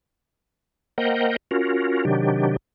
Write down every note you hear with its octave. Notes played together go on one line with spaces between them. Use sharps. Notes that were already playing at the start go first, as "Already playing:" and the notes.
A#3 A#4 C5 D#5 F#5 G5
C#4 F4 F#4 A#4
C3 D#3 F#3 D4 G4